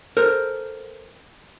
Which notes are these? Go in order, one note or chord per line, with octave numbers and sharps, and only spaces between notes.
A4 A#4 C5